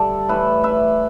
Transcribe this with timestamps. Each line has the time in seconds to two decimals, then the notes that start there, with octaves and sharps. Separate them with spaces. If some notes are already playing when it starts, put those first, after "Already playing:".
Already playing: G2 D3 A4 D5 E5
0.29 A2 E3 B4 E5
0.64 B4 E5